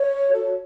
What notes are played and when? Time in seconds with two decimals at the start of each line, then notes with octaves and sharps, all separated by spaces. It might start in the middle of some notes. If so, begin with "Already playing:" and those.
Already playing: C#5
0.29 F#4 A4 C#5